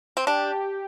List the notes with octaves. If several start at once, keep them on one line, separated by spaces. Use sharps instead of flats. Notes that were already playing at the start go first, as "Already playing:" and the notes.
C4
D4 G4